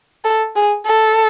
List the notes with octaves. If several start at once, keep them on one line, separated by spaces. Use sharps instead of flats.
A4
G#4
A4